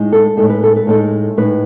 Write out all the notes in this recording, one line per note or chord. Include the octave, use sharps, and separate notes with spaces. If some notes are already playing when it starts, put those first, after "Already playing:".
Already playing: A2 G#3 D#4
A4
A2 G#3 D#4 A4
B4
A4
B4
A2 G#3 D#4 A4
A2 G#3 D#4 B4